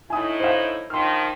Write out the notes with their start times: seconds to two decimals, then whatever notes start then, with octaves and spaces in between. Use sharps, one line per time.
0.10 A2 D#4 E4 G#5 D#6
0.40 C5 F5
0.90 D#3 F3 C6 F6